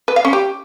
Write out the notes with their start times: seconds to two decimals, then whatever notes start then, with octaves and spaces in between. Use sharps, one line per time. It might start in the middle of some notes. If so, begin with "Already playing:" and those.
0.08 B4
0.16 F5
0.25 C#4
0.33 G4